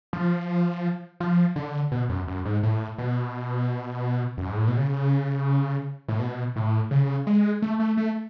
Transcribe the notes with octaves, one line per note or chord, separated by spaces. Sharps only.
F3
F3
D3
B2
F#2
F#2
G#2
A2
B2
F#2
G#2
A2
B2
C#3
A2
B2
A2
C#3
G#3
A3
A3
A3